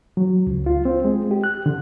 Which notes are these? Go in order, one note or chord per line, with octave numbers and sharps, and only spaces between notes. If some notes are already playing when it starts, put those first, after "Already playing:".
F#3
C#2
F4
C4
G#3
G4
F#6
D3